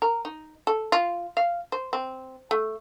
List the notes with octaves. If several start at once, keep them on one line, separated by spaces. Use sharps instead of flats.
A#4
D#4
A4
F4
F5
C5
C4
A3